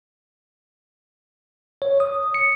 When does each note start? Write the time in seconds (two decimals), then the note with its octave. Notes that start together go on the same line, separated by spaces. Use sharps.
1.82 C#5
2.00 D#6
2.34 C#7